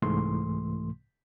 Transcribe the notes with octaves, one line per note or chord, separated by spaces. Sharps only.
C2 G#2 E3 A3 C6